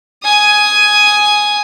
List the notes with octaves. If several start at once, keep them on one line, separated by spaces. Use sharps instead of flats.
G#5 D#6